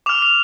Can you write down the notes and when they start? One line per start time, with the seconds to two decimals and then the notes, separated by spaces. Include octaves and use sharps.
0.06 D6 F6 F7
0.22 F7